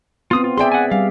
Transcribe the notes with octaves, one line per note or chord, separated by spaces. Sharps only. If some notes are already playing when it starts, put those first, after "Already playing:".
B3 C4 F4 D#6
F4
G#4 D5 E5 G5 C6
F#5 G#5
G3 F5